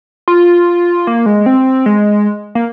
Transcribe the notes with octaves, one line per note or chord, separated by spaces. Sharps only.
F4
A#3
G#3
C4
G#3
A#3